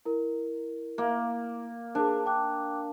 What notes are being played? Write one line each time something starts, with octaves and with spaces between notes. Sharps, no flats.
E4 A#4
A#3
D4 G#4 A#4
G5 D6 F#6